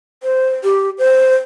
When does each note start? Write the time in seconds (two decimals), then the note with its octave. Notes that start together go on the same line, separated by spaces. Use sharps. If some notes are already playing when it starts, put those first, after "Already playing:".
0.23 C5
0.64 G4
0.98 C5